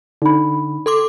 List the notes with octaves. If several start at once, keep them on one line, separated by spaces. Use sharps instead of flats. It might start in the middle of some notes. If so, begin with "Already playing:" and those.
D3 D#4 B5
A4 C6 D6